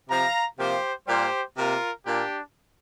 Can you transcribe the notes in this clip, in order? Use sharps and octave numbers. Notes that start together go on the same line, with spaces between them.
C3 F3 C4 F5 A#5
C3 F3 A#3 G4 C5
A#2 G3 A#3 G4 C5
C3 A#3 F4 A#4
A#2 A#3 D4 G4